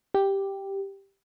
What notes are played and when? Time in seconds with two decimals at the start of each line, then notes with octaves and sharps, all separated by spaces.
0.14 G4